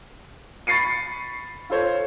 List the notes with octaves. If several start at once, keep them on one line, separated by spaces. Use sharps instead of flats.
B5 C#6 A6 C7 C#7 D#7
F4 A4 C5 C#5